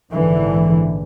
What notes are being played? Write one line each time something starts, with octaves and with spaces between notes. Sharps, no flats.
A#1 G#2 D3 E3